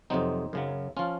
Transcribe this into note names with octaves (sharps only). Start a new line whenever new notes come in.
F2 C3 F#3 C4 D#4
F#2 C#3 F#3
F3 C#4 F4